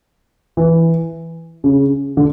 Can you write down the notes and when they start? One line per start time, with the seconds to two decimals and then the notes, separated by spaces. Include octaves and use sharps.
0.57 E3
1.64 C#3
2.17 D3